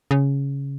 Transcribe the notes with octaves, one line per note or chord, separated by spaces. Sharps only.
C#3